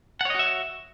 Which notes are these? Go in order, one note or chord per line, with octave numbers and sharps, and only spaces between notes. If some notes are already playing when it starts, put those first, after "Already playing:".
F#4 C#5 D#5 E5 F#5